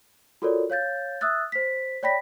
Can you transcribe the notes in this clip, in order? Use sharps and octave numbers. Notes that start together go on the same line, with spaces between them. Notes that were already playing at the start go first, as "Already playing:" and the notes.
F4 F#4 A4 A#4 C#5 D5
C#5 F5 G6 A6
E5 D#6 E6 F#6 A6
C5 B6
C#5 D5 G5 B5 A#6 B6